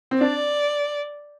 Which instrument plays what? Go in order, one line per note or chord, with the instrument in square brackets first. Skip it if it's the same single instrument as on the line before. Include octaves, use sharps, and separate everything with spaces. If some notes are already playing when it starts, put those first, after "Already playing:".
[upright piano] C4
[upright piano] D4 [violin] D5